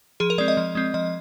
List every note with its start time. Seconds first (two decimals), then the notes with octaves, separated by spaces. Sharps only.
0.20 F3 G#4
0.30 A#4
0.38 G#3 C4 D5
0.48 D#5
0.57 F3
0.75 G#3 C4
0.94 F3 D#5